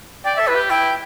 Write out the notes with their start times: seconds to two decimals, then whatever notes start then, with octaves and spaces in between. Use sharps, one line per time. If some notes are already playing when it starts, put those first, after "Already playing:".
0.24 D5 G5
0.36 A4 E5
0.47 E4 B4
0.55 G4
0.70 E4 G5